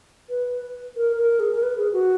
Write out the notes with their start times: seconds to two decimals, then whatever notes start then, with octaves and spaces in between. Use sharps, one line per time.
0.30 B4
0.96 A#4
1.18 A#4
1.40 G#4
1.52 A#4
1.63 B4
1.78 G#4
1.93 F#4